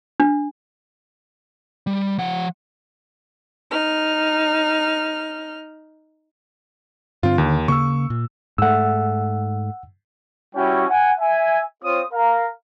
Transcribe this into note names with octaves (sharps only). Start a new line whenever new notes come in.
D4
G3
F3 F#5
D#4 F6
G2 D3 C4 F4
D#2 D3
C#3 A#3 C#6 E6
A#2
G#2 A3 F#5 E6
G3 C#4 E4 F#4 C#5 G5
F#5 G#5
E5 G#5
C4 F4 C5 C#5 D#6
A#4 F5 A#5